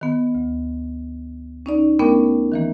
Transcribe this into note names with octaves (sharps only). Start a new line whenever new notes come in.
D#3 B3
D2
C#4 D#4 D5
A3 B3 C#4 D4 A#4 G5
D#3 E3 A#3